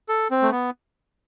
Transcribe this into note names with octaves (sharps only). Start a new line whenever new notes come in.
A4
C4
A3
B3